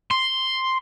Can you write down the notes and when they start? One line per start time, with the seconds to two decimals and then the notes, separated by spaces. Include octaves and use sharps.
0.11 C6